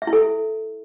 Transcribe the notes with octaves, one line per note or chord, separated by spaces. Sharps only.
E5
E4
A4